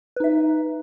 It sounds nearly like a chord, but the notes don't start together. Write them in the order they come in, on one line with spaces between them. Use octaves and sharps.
B4 D#4 E5